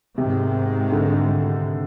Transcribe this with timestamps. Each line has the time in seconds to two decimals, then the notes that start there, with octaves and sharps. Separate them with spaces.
0.17 G#2 C3 D#3 G#3
0.92 D3